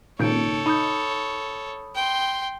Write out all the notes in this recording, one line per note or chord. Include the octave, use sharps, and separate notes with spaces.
G#1 A#2 C#3 D#4 A4 C#5 G6 D7
D#4 B5 D#6 G6
G5 C6